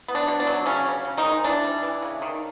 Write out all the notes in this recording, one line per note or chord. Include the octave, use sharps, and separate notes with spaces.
B3
D4
B2
D4
F#3
C#3 C#4
C#3
C#3
D#3 D#4
G#3
E3 D4
G3
E3
C#3
D#3